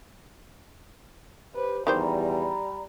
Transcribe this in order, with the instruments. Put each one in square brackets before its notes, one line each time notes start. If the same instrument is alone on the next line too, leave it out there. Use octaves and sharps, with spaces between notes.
[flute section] G4 C5 [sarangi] B4
[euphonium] E2 [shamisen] D#3 G4 C5 [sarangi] G3 [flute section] D5 A#5 B5